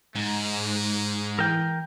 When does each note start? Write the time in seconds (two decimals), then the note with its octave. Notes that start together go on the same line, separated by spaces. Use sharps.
0.16 G#2 G#3
1.39 E3 A#4 G5